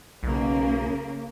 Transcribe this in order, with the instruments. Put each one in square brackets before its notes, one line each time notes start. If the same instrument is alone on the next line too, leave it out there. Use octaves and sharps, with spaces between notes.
[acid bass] B1 [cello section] C#3 A#3